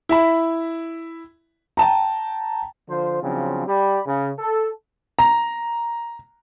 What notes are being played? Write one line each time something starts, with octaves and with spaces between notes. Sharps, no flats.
E4 E5 B5
G5 A5 A#5
D3 F3 F4 C5
C#3 F3 F#3 C4 D4
G3 G4 D5 B5
C#3
A4
A#5